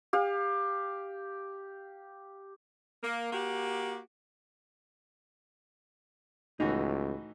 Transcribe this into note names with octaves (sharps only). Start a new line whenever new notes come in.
G4 F5
A#3
A#3 F#4 G4
C#2 A2 D#3 E3 D#4 F#4